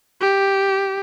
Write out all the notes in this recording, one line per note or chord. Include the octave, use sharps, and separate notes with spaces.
G4